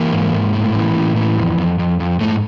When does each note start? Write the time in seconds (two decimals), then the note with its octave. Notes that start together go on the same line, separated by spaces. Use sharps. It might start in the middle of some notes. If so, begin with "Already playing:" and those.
Already playing: E3 A#3
0.12 G#2
0.33 G#2
0.53 A2
0.74 E3
0.95 A2
1.16 E3
1.38 F2
1.58 F2
1.79 F2
2.00 F2
2.20 G#2 A3